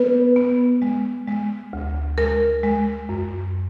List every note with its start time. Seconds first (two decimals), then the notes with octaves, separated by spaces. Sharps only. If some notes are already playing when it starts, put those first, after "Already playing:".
Already playing: B3 B4
0.36 B3
0.82 G#3
1.28 G#3
1.73 D2
2.18 G#3 A#4
2.63 G#3
3.09 F#2